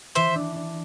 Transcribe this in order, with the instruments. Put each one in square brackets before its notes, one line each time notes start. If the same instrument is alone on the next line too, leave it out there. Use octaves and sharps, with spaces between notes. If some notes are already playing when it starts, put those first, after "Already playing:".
[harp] E3 [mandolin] C5 E5
[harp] D4
D4